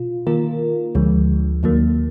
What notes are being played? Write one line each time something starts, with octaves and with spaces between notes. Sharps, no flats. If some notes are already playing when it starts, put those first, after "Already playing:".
Already playing: B2 F4
D#3 A#3 F4 A#4
D2 D3 F3 G#3
D#2 D#3 F#3 A#3